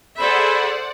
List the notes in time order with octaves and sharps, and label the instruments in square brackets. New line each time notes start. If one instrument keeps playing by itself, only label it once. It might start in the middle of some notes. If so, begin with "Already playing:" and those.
[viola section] G#4 A4 E5 [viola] C5 [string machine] D5 F#5 [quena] B5